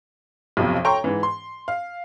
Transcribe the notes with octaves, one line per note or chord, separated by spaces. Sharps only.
B1 F2 C3 F3
A4 C#5 G5 A#5 C6 C#6
G#2 E3
C6
F5